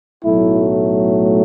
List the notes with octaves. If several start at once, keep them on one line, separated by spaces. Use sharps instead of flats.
B1 A2 F#3 A3 E4